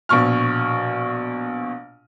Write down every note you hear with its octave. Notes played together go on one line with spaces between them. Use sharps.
A#1 B2 C#6 F6